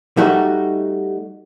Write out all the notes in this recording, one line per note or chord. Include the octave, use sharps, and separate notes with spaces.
G3 A3 D#4 F#4